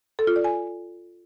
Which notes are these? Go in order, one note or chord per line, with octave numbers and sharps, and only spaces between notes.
A4
F4
D5
G#5